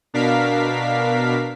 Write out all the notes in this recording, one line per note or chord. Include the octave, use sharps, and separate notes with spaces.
B2 D4 A#4 F5 B6